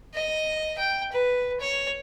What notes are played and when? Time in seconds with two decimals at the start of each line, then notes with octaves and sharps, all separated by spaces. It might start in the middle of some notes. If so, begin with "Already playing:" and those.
0.15 D#5
0.78 G5
1.12 B4
1.60 C#5